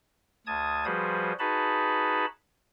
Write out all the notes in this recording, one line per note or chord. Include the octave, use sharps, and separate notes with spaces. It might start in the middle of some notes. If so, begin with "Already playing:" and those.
D2 A5 D#6 G#6
F3 G3 F#4 G#4 B4 C5
D#4 F#4 G#4 B4 A5 B5